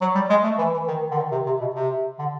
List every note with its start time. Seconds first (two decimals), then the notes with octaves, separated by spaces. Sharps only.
0.01 F#3
0.15 G3
0.30 G#3
0.44 A3
0.59 E3
0.73 E3
0.88 D#3
1.11 D3
1.17 D#3
1.32 C3
1.46 C3
1.61 B2
1.75 C3
2.19 D3